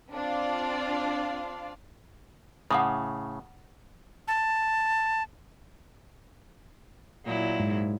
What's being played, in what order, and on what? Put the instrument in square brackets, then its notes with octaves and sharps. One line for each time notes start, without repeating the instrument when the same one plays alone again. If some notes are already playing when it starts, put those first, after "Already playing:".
[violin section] C4 D4 F4 D5 F5
[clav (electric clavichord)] A2 C#3 [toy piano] F#5 D6 D#6
[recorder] A5
[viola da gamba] A#2 F#3 E4
[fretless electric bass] G#2